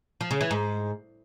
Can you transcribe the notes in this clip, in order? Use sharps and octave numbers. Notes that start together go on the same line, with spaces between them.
F3
C#3
E3
G#2